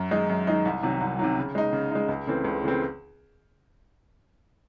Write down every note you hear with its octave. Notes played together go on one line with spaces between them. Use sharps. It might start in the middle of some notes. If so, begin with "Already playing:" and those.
Already playing: F#2
D#3 G#3 D#4
F#2
D#3 G#3 D#4
C2
C3 D#3 F#3
C2
C3 D#3 F#3
C#3
G#3 D#4
C#3
G#3 D#4
C#2
C#3 E3 A3 C4
C#2
C#3 E3 A3 C4